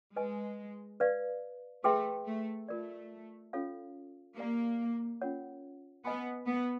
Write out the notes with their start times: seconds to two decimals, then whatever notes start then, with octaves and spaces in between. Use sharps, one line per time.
0.16 G#3 B4 D#5 G#5
1.00 B4 D5 F5
1.84 A3 G#4 B4 E5 G5 C6
2.27 A3
2.68 A3 F4 A#4 D5
3.53 C#4 F4 A4 C#5 F5
4.37 A#3 G4 A#4 D5 F5 A#5
5.21 C#4 F4 A#4 C#5 F#5
6.05 B3 B4 D#5 G#5 B5
6.47 B3